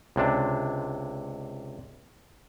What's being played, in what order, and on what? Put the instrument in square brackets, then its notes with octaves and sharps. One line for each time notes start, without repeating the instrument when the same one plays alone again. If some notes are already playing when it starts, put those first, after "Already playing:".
[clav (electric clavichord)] C#2 C3 D4